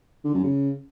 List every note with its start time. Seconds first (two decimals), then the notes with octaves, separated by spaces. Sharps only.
0.25 D3
0.34 F#2
0.44 C#3